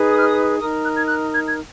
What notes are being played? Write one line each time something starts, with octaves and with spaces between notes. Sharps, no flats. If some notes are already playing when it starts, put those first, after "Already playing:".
Already playing: D#4 G#4 B4
D#6
F6
D#6
D#4 A#4 D#6
F#6
G#6
F#6
G#6
G#6